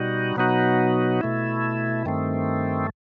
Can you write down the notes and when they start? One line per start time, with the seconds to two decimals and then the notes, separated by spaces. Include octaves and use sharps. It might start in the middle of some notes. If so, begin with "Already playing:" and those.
Already playing: B2 G3 D#4 F#4
0.36 B2 F#3 B3 D#4 F#4
1.21 B2 A3 E4
2.05 G2 D#3 A3 C4